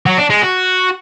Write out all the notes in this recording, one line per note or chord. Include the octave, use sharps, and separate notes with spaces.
F#3
D4
G#3
F#4